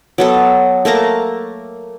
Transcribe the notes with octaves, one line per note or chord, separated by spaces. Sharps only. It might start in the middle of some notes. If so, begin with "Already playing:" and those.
F#3 B3 A4
A3 A#3 A5 A#5